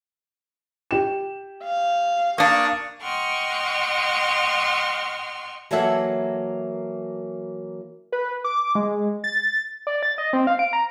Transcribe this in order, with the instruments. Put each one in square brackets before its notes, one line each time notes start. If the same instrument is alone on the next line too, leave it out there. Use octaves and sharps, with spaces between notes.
[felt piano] G4 E7
[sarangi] F5
[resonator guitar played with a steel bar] A#3 D4 [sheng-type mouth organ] C#6 D#6
[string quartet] D#5 F#5 G5 C6 C#6 F6
[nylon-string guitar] E3 F#3 A#3 A4 E5 F#5
[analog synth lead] B4
D6
G#3
A6
D5
A6
D#5
C4
F5
D7
A#5